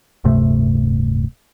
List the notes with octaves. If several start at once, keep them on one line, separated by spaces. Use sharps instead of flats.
D1 G2 C3 A3